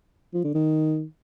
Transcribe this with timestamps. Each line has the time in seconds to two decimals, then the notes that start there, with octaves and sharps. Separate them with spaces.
0.34 F3
0.44 D3
0.54 D#3